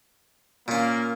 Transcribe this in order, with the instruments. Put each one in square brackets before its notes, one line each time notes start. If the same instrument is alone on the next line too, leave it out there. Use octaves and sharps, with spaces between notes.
[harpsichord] A#2 C#4 [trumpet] A#3